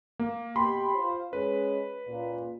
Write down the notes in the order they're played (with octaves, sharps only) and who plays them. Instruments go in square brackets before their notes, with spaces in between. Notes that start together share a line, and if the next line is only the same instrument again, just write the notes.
[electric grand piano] A#3
[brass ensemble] B2 G4 G5 [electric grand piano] B5 C6
[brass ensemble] F4 C5
[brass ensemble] G#3 C#4 G#4 [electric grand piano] B4
[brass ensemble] C#2 A#2